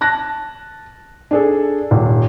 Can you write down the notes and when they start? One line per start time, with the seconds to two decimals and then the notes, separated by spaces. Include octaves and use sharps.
0.01 A5 F#6 A#6
1.31 D4 G#4 A4
1.91 D#1